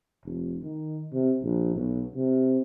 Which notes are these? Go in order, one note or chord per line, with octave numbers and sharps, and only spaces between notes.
F1
D#3
C3
A#1
B1
C3